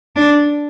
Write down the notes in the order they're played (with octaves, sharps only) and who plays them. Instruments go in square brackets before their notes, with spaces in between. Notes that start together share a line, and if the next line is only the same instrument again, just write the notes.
[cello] D4